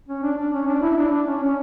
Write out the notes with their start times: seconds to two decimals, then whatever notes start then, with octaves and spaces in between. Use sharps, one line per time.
0.08 C#4
0.23 D4
0.37 D4
0.53 C#4
0.67 D4
0.82 E4
0.98 D4
1.12 D4
1.27 C#4
1.43 C#4